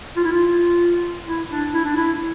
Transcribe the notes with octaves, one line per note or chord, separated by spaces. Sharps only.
F4
E4
F4
E4
D4
E4
D4
E4